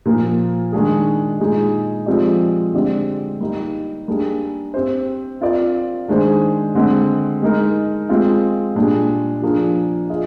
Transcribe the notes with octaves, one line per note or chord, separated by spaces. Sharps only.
A#2 F3 A#3
D#3 G#3 D4 G#4
A#2 G#3 D#4 G#4
F3 G#3 C4 G4 D5
D3 G#3 C4 G4 D5
G3 A#3 D#4
G3 A#3 D4 G#4
C4 G4 C5
C4 F4 A#4 D5
D#3 G#3 D4 G#4 C5
D3 G#3 C4
G#3 D#4 A#4
G#3 C4 F4
A#2 G3 D4 G#4
F3 A#3 D4 G#4
F4 G#4 D#5